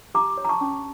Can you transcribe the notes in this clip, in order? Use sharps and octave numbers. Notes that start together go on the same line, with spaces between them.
G4 A#5 D6
C#5
A#5
A5 C#6
C#4